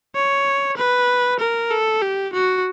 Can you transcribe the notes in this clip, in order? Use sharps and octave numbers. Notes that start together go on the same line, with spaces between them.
C#5
B4
A#4
A4
G4
F#4